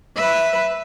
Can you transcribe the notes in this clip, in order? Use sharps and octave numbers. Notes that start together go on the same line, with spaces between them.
B4 E5